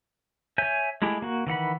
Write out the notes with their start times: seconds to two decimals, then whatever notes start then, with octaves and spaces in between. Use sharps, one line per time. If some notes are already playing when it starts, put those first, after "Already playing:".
0.58 C#5 E5 G#5 G6
1.02 G#3 A3 E4 G4 G#4
1.22 A#3 F#4
1.47 D#3 E3 F#5 B5